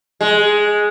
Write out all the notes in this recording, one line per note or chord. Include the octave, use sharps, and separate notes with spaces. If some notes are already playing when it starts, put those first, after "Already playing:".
G#3